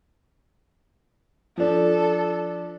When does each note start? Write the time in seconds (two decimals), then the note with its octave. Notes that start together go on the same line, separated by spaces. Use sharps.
1.57 F3 D4 A4